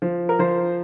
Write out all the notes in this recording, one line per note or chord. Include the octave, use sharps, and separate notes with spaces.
F3
A#4
F3 C5